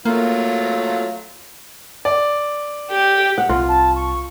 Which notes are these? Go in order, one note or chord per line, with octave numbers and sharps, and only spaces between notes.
F#3 A3 A#3 F4
D5
G4
F#5
C2 F4
A5
C#6